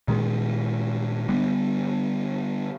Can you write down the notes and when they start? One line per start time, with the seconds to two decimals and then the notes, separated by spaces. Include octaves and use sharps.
0.08 A#2 D#3 G#3
1.28 D3 G3 B3